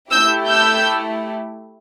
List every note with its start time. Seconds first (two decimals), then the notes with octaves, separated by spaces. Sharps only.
0.11 A3 E4 G4 E6 G6
0.48 E6 G6